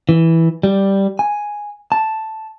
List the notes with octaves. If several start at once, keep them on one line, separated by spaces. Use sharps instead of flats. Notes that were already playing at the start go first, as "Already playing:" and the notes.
E3
G3
G#5
A5